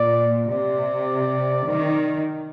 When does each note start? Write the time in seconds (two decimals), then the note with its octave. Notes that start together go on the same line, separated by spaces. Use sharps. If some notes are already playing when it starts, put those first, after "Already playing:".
Already playing: A#2 D5
0.50 C3 D5
1.67 D#3